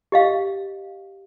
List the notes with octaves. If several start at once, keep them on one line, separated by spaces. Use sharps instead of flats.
G4 D#5 F5